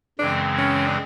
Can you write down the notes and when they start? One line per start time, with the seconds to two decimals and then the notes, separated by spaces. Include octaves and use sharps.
0.19 F#2 C#3 E3 G#3 C4 D4
0.58 C#4
0.86 D4